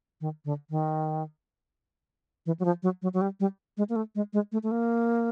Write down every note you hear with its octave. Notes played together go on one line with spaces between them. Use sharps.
D#3
D3
D#3
E3
F#3
F3
F#3
F#3
F#3
G3
G3
G#3
A#3
A3
G#3
G#3
A3
A3
A#3